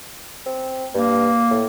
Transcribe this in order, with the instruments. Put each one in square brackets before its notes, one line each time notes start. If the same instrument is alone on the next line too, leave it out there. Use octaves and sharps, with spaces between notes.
[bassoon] C4
[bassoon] G2 [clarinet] A#3
[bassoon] A2